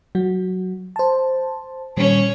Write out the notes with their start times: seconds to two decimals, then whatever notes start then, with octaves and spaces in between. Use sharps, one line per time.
0.15 F#3 F#4
0.96 C5 A5
1.97 A#2 D#3 G3 C#4 C#5